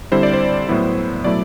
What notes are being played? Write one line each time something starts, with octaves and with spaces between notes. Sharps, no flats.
D3 G3 C4 E4 C5
D5
C5
A2 F#3 B3 E4
B2 F#3 A3 E4 D5